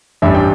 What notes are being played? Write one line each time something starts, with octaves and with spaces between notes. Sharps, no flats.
A1 G2 G3 E5
G5